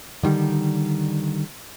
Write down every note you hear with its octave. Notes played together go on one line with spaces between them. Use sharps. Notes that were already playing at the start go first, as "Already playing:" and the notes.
D3 D#3 G3